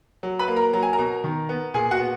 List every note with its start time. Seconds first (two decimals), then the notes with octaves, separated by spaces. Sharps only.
0.23 F#3
0.39 B4 B5
0.48 A#3
0.56 A#4 A#5
0.73 F#3 A#5
0.83 G#5
0.93 A#4 A#5
0.99 B2
1.24 D#3
1.49 B3
1.74 A#2 G#4 G#5
1.91 F#4 F#5
2.00 B3